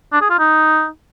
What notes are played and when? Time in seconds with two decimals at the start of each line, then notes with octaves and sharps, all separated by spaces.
0.13 D4
0.21 G#4
0.30 F4
0.39 D#4